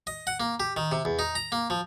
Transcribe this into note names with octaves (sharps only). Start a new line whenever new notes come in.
D#5
F#5
A#3
G4
D#3
C3
E2
D#4
A#5
A#3
F3